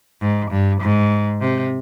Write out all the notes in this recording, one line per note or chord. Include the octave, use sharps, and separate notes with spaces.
G#2
G2
G#2
C3